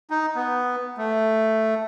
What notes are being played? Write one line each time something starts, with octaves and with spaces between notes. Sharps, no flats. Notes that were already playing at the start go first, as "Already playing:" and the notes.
D#4
B3
A3